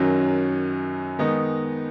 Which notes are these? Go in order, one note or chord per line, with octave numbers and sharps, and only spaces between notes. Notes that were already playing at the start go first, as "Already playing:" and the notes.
Already playing: F#2 D#3 F#3 C#4
D#3 G#3 B3 D#4